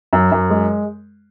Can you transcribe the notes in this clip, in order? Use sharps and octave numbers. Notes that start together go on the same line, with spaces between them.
F#2
F#2
G#3